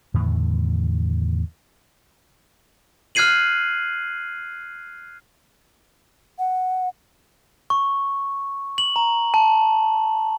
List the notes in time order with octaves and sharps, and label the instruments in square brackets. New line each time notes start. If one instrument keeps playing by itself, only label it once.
[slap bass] E2 A2 D3 D#3
[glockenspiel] F6 F#6 G#6 C7 D#7 F#7
[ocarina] F#5
[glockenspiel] C#6
F#7
A#5
A5